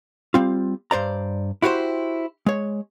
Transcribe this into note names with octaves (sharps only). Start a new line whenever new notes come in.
G3 C4 F4
G2 C5 D5 A#5
E4 F#4 G4 B4 C5
G#3 C#5